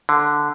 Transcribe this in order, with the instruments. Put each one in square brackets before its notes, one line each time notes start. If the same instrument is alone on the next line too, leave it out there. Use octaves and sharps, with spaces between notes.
[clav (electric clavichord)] D3